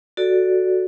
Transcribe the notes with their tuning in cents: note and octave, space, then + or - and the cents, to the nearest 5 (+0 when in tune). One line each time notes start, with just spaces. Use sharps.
F#4 +0 A4 +0 D5 +0